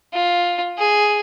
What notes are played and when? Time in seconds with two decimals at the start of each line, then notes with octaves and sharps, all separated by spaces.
0.14 F4
0.79 G#4